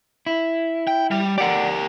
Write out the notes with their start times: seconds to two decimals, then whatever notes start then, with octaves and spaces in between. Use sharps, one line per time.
0.26 E4
0.87 G5
1.11 G3
1.38 G4 A#4 D5 F#5